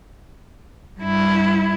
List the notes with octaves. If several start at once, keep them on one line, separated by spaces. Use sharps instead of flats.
G2 E4